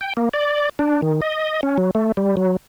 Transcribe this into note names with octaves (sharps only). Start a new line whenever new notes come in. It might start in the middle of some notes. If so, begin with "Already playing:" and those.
G5
A#3
D5
D4
D#3
D#5
C#4
F#3
A3
G3
F#3